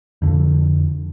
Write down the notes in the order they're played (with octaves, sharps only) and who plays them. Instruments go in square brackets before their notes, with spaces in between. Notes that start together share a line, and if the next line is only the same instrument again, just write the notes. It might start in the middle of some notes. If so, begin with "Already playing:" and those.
[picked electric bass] F2 D3